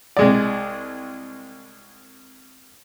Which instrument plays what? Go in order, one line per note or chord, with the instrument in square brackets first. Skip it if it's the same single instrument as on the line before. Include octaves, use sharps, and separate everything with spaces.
[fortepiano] C2 G#3 D5